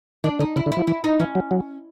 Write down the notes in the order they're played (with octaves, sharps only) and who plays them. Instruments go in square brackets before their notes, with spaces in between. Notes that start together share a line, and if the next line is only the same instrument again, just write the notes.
[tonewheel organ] D#3 [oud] D4
[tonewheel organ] D3 [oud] D#4
[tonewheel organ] C#3 [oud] E4
[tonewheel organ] D3
[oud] E4
[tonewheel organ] F3
[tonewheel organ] E3 [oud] E4
[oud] D#4
[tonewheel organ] E3 [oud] C#4
[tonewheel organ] F#3
F#3